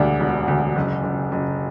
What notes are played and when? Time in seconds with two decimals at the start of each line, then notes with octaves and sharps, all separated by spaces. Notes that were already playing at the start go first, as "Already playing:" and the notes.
Already playing: E1 D2 G3 D4
0.20 E1
0.48 D2
0.76 F#1
1.03 F#1
1.32 F#1